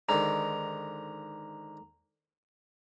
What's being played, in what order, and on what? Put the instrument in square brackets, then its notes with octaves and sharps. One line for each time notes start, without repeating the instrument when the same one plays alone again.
[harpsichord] G#2 D3 D#3 [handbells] A#5